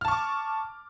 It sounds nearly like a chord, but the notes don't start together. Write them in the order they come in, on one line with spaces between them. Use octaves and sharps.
F6 A5 C#6 D6